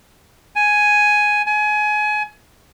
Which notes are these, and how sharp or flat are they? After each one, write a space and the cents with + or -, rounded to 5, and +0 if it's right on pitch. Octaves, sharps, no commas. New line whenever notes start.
G#5 +5
G#5 +25